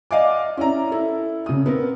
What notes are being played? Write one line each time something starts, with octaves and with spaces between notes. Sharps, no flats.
D5 D#5 F5 F#5 G#5 D6
C#4 E4 D5 A#5
E4 A4
C#3 D#6
B3 C4 A#4